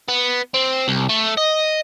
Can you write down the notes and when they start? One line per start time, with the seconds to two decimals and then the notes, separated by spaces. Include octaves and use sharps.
0.08 B3
0.54 C4
0.88 C2
1.09 A3
1.37 D#5